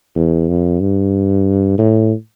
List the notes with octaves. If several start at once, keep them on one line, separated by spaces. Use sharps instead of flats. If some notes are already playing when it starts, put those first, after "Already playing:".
E2
F2
G2
A2